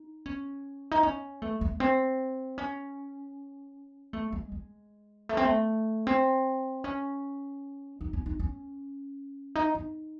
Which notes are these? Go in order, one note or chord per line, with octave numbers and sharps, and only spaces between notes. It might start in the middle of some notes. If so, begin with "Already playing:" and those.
Already playing: D#4
C#4
D#4
C#4
A3
A3
A3
C4
C#4
A3
G#3
G#3
A3
C4
A3
C4
C#4
D#4
C#4
D#4
C#4
D#4
D#4